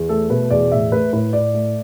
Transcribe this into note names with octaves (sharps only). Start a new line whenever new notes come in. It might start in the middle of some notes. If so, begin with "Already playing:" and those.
Already playing: E2
A3 A4
B2 B4
E2 D5
A2 E5
A3 B4
A2 B4
A2 D5
A3